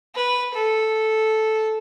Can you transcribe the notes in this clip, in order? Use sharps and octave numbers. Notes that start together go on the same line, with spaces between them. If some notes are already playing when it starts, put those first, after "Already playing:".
B4
A4